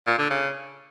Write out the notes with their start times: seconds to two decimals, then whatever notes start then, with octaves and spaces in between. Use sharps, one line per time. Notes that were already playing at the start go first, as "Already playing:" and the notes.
0.07 A#2
0.19 D3
0.30 C#3